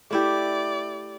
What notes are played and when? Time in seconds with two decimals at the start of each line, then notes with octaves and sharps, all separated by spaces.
0.11 A3 E4 G4 D5